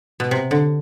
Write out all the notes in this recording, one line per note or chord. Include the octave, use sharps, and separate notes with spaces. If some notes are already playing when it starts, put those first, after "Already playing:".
B2
C3
D3